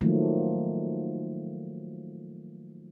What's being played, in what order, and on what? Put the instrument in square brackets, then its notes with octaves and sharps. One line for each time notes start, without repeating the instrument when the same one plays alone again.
[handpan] D#3 F3 F#3 A3 A#3